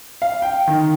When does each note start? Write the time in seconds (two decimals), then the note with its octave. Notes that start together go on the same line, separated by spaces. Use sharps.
0.22 F5
0.42 G5
0.67 D#3